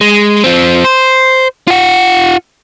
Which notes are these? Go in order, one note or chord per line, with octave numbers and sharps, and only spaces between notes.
G#3
F3 C4
C5
F4 F#5